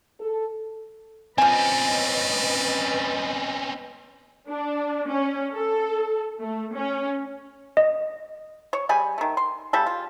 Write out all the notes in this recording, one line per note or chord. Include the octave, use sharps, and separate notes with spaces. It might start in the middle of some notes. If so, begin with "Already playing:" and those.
A4
F3 C4 C#4 B4 D5 D#5 G#5
D4
C#4
A4
A3
C#4
D#5
C#5
G3 G#4 G#5 B5
D#3 A3
C6
C#3 G3 A4
F4